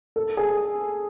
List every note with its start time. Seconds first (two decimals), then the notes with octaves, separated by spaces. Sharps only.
0.16 A4
0.37 G#4